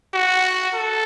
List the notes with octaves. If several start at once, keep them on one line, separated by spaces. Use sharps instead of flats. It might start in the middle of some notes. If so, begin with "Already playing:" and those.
F#4
A4